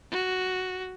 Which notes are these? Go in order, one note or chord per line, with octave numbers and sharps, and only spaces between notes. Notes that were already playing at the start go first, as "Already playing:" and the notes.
F#4